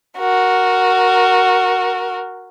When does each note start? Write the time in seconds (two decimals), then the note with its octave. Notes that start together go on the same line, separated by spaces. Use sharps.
0.18 F#4 A#4